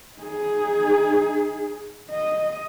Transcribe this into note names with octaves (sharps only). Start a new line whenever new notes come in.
D#4 G#4
D#5